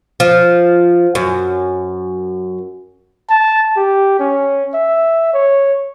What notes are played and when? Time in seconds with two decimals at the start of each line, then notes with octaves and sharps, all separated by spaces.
0.20 F3
1.15 F#2
3.30 A5
3.77 G4
4.19 C#4
4.74 E5
5.34 C#5